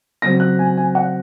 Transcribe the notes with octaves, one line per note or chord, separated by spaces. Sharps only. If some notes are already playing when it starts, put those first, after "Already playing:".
C#3 F#3 C4 A#6
F#6
G#5
G#5
F#5